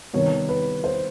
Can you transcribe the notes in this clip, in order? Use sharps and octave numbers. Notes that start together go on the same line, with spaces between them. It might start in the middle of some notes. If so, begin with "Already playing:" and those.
C3 D#3 G3 B3 C#5
B4
C5